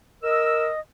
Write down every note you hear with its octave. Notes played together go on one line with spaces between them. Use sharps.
A#4 D#5 E6